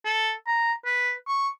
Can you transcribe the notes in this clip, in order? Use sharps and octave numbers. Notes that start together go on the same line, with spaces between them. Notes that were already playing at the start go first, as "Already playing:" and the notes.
A4
A#5
B4
C#6